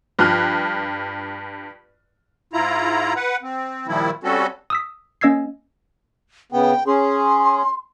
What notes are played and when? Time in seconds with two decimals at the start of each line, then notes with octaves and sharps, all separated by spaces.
0.19 G2 F3 F6 F#6
2.53 G#2 E4 F4 A#5
3.16 B4 F#5
3.42 C4
3.87 A#2 D#3 F3 G3 E4
4.24 G3 C4 C#4 F#4 A4
4.70 D#6 E6 B6
5.21 A#3 C#4 D#5 E6 G#6 C7
6.52 C#3 B3 G5
6.87 C#4 G#4 C6